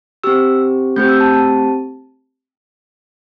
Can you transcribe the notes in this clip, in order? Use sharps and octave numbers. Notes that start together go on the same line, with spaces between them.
C4 G4 E6
A3 C4 G4 G6
E6
A5
A5